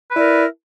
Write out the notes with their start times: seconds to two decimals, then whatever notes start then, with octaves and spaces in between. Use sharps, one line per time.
0.10 B4
0.13 E4
0.16 D5
0.19 A#4